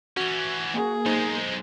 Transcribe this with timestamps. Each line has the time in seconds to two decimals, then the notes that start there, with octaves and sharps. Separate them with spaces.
0.17 E3 C#4 F#4
0.74 A#3 G#4
1.06 B1 G#3 D#4 C5